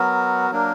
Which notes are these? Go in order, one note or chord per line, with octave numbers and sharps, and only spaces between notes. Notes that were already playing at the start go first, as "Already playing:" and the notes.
Already playing: F#3 B3 F#4 A#4
F#3 A#3 D4 A#4